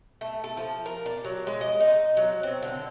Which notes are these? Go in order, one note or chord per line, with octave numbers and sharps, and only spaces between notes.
A3
A4
F3
A#4
D5
F#3
G#3
D#5
D#4
F#3
C4
D3